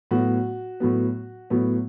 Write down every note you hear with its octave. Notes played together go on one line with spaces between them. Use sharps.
A2 F#3 B3 F#4
A2 F#3 B3
A2 F#3 B3